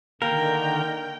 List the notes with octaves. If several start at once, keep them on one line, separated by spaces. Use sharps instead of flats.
D3 D#3 A#3 A#4 G5